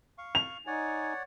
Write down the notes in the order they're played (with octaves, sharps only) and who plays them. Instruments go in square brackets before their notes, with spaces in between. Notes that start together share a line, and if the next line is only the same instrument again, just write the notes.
[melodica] F5 C#6
[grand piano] F7
[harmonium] D#4 G#5 [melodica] C#5 D5 F#5